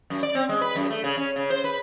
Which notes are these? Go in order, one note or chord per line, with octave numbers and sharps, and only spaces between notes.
F#2
D5
C4
G#3
B4
F#2
A3
C#3
C#4
C#3
C5
B4